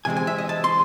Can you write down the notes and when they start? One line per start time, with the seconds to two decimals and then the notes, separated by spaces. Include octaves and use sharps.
0.05 C3 E3 G#3 C4 G#5
0.17 G#5
0.27 E5
0.38 D#5
0.49 A5
0.64 C6